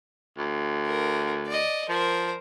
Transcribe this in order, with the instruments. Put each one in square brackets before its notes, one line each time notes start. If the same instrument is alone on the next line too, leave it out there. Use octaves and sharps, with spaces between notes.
[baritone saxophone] D2
[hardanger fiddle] A#4
D5 D#5
[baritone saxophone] F3 [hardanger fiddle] A#4 C5